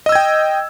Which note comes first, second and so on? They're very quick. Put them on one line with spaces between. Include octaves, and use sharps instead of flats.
D#5 E6 G#6 G5